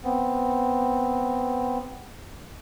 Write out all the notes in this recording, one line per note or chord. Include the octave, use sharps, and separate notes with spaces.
B3 C4